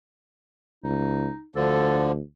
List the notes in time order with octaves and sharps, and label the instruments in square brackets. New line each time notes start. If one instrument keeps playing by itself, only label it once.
[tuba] C#2 [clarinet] D#4
[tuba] D2 [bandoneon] D3 F3 [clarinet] A4